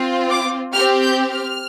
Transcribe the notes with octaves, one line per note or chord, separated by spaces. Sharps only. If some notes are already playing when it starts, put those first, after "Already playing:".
Already playing: C4 F4
D6
C4 G4 F6
G6
F6